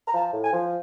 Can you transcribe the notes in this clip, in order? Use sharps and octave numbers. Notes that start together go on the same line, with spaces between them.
A#5
F3 A5
A2
G#5
F3